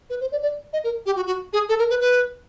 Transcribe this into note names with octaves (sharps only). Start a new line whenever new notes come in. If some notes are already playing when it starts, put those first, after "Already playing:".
B4
C5
D5
D5
D#5
A#4
G4
F#4
F#4
G#4
A4
A#4
B4
B4